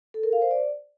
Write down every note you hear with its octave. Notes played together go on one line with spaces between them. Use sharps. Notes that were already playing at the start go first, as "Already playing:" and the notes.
A4
A#4
F5
C5
D5